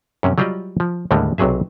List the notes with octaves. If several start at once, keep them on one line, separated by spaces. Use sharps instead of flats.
F#2 C3 C#4
F#3 G3 F4 G4 D5 D#5
F3
D#2 A2 D3 G3 G#3
B1 C3 F#3 G#4 E5